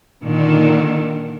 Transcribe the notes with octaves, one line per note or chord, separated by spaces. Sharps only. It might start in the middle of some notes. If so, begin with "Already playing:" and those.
A#2 D3 D#3